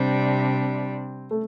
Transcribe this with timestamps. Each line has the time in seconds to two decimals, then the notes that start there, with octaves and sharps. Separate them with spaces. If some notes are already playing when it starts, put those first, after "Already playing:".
Already playing: C3 G3 C4 D4
1.31 A3